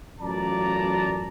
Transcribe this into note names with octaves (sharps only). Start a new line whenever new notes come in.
A1 F#2 F4 D5 A5 A#5